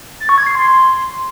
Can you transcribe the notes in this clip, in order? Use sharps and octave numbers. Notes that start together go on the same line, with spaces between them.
A6
C#6
G#6
C7
C6